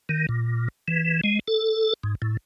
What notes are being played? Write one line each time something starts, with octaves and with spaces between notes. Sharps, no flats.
D#3
A#2
E3
G#3
A4
G#2
A2